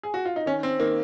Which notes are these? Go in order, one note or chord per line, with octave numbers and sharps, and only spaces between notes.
G#4
F#4
F4
D#4
D#3 C#4
C4
D#3 A#3